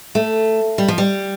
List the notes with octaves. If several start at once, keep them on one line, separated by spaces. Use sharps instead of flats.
A3
G3
F3
G3